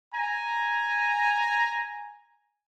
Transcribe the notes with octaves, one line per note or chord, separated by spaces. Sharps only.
G#5 A#5